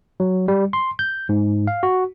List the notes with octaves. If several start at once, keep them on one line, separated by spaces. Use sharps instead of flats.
F#3
G3
C6
G6
G#2
F5
F#4